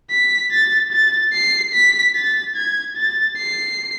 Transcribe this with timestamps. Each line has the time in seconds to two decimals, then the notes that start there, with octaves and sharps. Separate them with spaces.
0.10 B6
0.51 A6
0.92 A6
1.33 C7
1.74 B6
2.15 A6
2.56 G#6
2.97 A6
3.38 C7